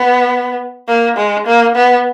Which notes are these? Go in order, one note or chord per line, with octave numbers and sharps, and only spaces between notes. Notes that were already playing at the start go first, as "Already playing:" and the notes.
Already playing: B3
A#3
G#3
A#3
B3